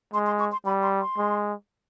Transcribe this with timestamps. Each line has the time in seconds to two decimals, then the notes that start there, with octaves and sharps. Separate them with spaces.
0.14 G#3 C6
0.27 C6
0.39 C#6
0.52 C6
0.65 G3 B5
0.83 C6
1.00 C6
1.18 G#3